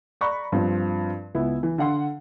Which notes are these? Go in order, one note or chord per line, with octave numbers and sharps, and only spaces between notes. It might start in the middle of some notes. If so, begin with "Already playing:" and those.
D5 A#5 B5 C#6 F#6
G2 F3 C4
C#2 B3 E4
E3
D3 F5 F#5 C6